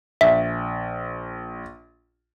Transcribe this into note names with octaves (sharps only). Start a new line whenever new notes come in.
A#1 E5